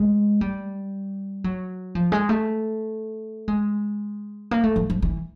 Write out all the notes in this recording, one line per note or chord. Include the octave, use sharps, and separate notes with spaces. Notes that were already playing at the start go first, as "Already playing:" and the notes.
Already playing: G#3
G3
F#3
F3
G#3
A3
G#3
A#3
A3
F3
F3
E3